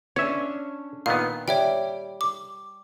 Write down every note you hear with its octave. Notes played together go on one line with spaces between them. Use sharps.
C#4 D4 C#5 E5
A#2 D#3 B3 F5
G3 C#5 E5 G5
D6